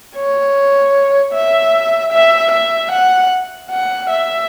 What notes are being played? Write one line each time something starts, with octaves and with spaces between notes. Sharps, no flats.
C#5
E5
E5
E5
F#5
F#5
E5